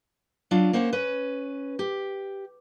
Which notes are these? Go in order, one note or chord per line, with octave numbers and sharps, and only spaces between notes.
F#3 D4 F4
A#3 C#4 C5 F#5
C#4 B4
G4